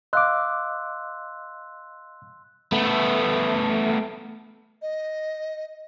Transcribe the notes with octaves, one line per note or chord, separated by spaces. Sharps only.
D#5 F5 C6 D6 E6 F#6
A3 B3
D#5